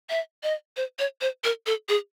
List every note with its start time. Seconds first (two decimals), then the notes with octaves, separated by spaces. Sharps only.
0.10 E5
0.43 D#5
0.77 C5
0.99 C#5
1.21 C5
1.44 A#4
1.66 A4
1.89 G#4